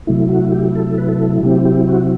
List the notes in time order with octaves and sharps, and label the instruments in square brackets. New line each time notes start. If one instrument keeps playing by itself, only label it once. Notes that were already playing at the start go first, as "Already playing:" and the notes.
[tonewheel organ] C3 F#3 A3 E4
F#4
G4
A4
B4
A4
C3 F#3 C4 E4 G4
G4
F#4